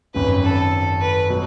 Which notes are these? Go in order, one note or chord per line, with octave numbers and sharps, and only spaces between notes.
G#1 F#2 C#3 B4
A4
B4
B2 F#3